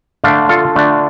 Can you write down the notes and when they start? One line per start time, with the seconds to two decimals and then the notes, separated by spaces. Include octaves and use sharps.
0.24 D3 A3 D4 D5 F5
0.49 F4 A4
0.76 D3 A3 D4